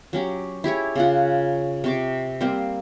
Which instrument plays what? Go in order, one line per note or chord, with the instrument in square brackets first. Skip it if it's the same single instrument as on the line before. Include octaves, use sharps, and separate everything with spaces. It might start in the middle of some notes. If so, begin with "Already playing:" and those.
[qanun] F#3 C#4 G4
E4 G4 G#4 C#5
C#3 F4 F#5
C3 C#6 D6
G3 A#3 C4 C5